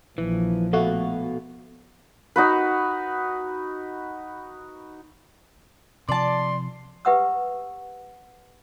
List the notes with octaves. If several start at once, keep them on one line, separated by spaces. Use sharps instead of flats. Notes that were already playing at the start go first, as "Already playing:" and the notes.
A#1 E3 F3
B2 A3 B3 F#4 F5
D#4 F#4 B4
C3 F3 D5 A5 C6
G4 B4 E5 F#5 D#6 E6